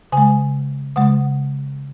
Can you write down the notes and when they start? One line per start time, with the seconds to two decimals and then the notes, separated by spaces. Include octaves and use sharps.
0.12 C#3 G#3 G#5
0.96 C#3 G#3 F#5